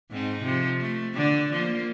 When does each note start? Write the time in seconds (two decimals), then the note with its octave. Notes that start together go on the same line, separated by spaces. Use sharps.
0.11 G#2 C4 D#4
0.43 C3 F3
0.80 A3
1.14 D3 D4
1.53 F3 A#3